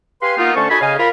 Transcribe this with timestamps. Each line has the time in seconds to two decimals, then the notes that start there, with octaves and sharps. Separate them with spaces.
0.22 G4 B4 F5 G#5 C6
0.38 A#3 B3 D#4 F4
0.55 D3 A3 C#4 C5 A5 C#6
0.69 D#4 F#4 A4 D#5 G#5 B5
0.81 C#3 D#5 F5 G#5
0.98 F4 A#4 B5